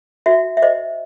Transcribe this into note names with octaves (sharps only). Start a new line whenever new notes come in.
F#4 E5
E5
C5 D#5